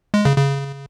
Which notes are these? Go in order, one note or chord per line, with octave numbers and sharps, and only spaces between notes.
G#3
C#3
C#3